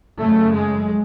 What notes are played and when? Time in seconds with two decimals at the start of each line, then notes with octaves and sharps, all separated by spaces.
0.18 F#2 C#3 A3
0.53 G#3